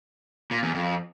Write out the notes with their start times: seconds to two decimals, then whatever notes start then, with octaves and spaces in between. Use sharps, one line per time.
0.51 A#2
0.63 E2
0.75 F2